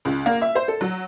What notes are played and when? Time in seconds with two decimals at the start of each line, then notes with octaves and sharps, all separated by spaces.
0.05 C#2
0.26 A#3
0.42 E5
0.55 C5
0.68 A4
0.81 F#3